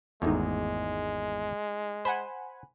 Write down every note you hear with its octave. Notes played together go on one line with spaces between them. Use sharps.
G#1 E2 G#3 A3 D#4
C5 F#5 G#5 B5